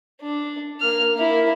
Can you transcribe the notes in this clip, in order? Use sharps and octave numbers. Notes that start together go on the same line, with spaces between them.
D4
A#3 F6
A#3 E4